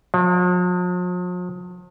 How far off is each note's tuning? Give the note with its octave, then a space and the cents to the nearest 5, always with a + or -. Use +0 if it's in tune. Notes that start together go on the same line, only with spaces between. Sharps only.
F3 +45